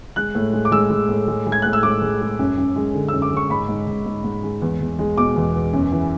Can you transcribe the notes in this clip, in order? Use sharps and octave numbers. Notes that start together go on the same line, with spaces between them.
G#3 F#6
A2
G#3
D6
G#3 E6
G#3
A2
G#3
G#3
G#6
A2 F#6
E6
G#3 D6
G#3
G#3
F#2
F#2
G#3
D3
F#2 E6
D6
G#3
C#6
G#2 B5
G#2
G#2
G#2
G#2
G#3
E2
E2
G#3
B2 D6
E2
E2
F#2
E3